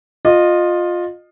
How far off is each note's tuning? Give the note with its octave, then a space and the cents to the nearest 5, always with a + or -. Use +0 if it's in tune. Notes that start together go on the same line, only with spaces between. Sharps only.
F4 +15 D#5 -20